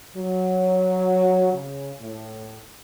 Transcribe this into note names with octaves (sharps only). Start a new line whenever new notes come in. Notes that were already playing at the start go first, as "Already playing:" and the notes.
F#3
C#3
A2